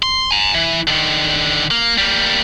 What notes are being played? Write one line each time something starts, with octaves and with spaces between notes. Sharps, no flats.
C6
G#5 A#5
E3
D3 D#3
A#3
G3 A#3